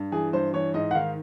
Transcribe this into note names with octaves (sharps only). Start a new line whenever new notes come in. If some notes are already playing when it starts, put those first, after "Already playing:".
Already playing: G2
E3 G#4
G2 C5
E3 C#5
G#2 D#5
F#5
D#3 F5